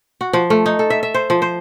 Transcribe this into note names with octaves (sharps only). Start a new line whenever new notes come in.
F#4
F3
A3
D#4
A4
E5
E5
C5
F3
C5